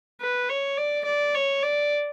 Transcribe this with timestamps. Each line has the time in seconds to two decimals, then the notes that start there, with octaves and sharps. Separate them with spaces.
0.21 B4
0.49 C#5
0.78 D5
1.06 D5
1.35 C#5
1.63 D5